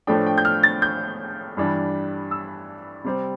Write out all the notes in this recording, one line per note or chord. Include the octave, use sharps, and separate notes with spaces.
A2 F3 A3 D4 G5
G5
G6
F6
A6
G6
G2 E3 G3 D4
E6
C3 G3 C4